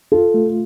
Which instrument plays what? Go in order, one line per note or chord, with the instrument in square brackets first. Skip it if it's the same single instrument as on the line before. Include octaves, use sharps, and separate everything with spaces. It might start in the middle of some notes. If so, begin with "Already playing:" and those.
[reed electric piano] F4 [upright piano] A4
[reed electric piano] A3